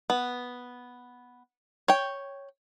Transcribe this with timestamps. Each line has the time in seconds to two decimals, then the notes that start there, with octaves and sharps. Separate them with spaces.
0.10 B3
1.88 C#5 G5